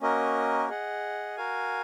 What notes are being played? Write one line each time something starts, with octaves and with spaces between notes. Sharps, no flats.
A#3 C#4 F#4 A#4 D#5
G#4 D#5 F#5
F#4 A#4 F5 G#5